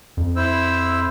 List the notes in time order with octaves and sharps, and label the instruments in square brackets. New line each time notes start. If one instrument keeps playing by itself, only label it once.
[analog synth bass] F2
[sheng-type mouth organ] E4 C5 E6